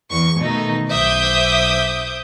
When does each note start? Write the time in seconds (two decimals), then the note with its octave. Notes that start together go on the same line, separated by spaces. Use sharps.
0.11 E2 C#6
0.40 B2 D#3 A3 D#4
0.90 B1 C5 E5 D6 D#6 G6